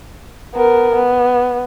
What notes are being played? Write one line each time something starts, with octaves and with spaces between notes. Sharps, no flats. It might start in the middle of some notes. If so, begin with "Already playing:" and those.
B3 A#4
B3